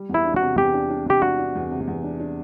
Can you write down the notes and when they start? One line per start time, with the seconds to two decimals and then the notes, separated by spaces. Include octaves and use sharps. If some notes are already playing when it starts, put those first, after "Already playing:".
Already playing: G3
0.09 E2
0.14 E4
0.25 D4
0.36 F#4
0.42 C3
0.58 E2 G4
0.74 D4
0.90 D4
1.07 C3 G4
1.22 D4 F#4
1.39 D4
1.55 E2
1.71 C3
1.87 E2
2.04 D4
2.20 D4